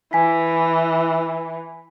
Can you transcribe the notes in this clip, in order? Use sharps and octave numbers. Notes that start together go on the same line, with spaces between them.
E3 G#5 B6